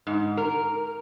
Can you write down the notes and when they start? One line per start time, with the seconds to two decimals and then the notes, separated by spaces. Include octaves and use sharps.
0.07 G#2
0.37 A#4